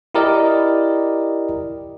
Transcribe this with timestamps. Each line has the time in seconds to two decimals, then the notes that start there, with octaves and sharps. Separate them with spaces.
0.15 E4 G4 A#4 D5 D#5